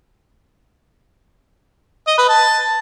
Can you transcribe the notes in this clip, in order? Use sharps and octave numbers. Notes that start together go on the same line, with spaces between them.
D#5
B4
A5